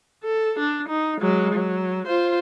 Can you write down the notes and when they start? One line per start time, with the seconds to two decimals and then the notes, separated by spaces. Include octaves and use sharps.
0.24 A4
0.59 D4
0.89 D#4
1.21 F#3 G#3
1.54 F#3
2.07 F4 C5